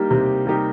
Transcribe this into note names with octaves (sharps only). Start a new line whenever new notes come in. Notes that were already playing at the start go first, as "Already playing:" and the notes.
Already playing: G3 A#3 D#4 G4
C3
G3 A#3 D#4 G4